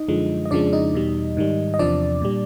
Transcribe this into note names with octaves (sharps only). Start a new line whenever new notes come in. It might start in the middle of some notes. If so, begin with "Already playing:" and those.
Already playing: D#4 D#5
F#2 D3 F3 G#3
D#5
F2 C#3 F3 G#3 D4 D5
D#4 D#5
E2 B2 G3
G#2 D#3 G3
D#5
E2 C3 F3 D4 D5
A#2 G3